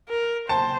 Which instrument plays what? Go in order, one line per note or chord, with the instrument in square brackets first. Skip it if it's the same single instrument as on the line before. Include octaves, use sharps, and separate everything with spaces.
[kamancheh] A#4
[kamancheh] C5 [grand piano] A5